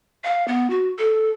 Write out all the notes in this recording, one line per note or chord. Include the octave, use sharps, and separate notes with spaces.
F5
B3
F#4
A4